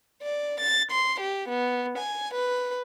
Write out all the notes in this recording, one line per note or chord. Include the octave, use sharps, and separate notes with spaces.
D5
A6
C6
G4
B3
G#5
B4